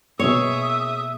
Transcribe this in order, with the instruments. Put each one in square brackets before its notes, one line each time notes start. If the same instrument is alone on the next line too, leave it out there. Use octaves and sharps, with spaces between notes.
[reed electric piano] B2 A#3 [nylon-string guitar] G#4 C#5 [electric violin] E5 D#6